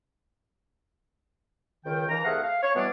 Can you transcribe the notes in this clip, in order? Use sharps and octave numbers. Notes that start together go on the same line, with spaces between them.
C#2 D#3 G5
D#2 E3 A#5
C2 A3 G#4 F5 F#5
F5
C#5
B2 E3 G3 B3 D4